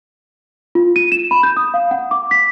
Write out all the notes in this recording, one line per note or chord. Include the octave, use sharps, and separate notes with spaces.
F4
D#7
E7
B5
G6
D#6
F5
F#5
D6
B6